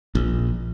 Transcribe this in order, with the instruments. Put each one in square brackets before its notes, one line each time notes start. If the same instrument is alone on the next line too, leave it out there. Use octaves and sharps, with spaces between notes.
[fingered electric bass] A#1